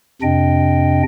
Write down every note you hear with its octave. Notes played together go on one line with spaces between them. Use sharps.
F2 C3 D4 D#5 G5